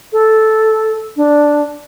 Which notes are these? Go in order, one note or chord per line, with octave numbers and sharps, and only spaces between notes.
A4
D4